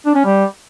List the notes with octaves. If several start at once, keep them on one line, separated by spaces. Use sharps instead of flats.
D4
C#4
G3